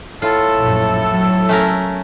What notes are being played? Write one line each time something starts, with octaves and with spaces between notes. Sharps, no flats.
A2 F4 A4
A#1 F#2
F#3
A3 C#4 A#4